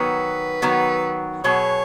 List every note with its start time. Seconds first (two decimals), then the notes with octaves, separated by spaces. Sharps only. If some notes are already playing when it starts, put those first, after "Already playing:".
Already playing: D#3 F#3 B3 B4
0.62 D#3 F#3 B3
1.44 B2 F#3 B3 G#4 C#5